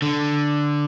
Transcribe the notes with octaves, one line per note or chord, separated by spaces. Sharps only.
D3